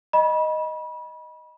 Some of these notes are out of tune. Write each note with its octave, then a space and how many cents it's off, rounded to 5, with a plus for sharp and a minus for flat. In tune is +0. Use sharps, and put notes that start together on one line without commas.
D#5 +0 B5 -30